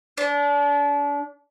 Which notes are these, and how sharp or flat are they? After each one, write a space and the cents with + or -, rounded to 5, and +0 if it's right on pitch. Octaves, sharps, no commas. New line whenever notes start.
D4 -35